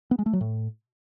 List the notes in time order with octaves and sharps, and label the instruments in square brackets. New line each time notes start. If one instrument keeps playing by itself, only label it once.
[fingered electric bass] B3
G#3
A3
F#3
A2